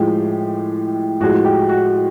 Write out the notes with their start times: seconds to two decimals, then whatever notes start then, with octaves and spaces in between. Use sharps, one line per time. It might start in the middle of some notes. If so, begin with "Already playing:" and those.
Already playing: A2 F3 G#3 G4
1.20 A2 F3 G#3 F#4
1.45 G4
1.69 F#4